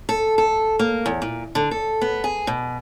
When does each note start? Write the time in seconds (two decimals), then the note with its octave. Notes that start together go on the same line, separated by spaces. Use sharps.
0.09 A4
0.38 A4
0.79 A#3
1.06 E2
1.22 A#2
1.55 D3
1.71 A4
2.01 B3
2.24 G#4
2.47 B2